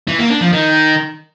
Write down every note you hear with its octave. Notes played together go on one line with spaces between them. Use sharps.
E3
A#3
D4
F3
D#3